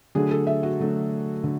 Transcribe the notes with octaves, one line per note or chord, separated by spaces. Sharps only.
D3 F#3 A3 D4 G#4
A4
E5
F#4
D3 F#3 A3 D4
D3